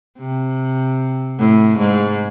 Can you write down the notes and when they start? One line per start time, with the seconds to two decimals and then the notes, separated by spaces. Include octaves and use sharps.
0.19 C3
1.39 A2
1.78 G#2